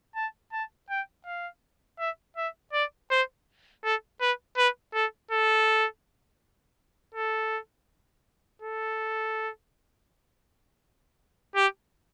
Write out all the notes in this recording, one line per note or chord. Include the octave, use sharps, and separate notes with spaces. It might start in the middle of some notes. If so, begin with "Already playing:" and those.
A5
A5
G5
F5
E5
E5
D5
C5
A4
B4
B4
A4
A4
A4
A4
G4